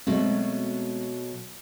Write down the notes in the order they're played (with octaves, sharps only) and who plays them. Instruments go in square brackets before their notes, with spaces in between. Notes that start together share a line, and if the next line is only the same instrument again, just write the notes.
[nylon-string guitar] B2 F#3 A3 [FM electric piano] G#3 C4